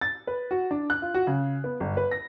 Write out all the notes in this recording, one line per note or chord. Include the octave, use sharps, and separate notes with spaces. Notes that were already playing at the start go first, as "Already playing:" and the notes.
A6
B4
F#4
D4
F#6
F4
F#4
C#3
B3
G1
B4
A#6